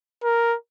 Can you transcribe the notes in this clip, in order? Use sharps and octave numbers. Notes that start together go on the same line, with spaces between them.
A#4